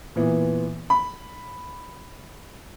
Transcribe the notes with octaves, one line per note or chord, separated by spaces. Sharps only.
A#2 E3 B3
B5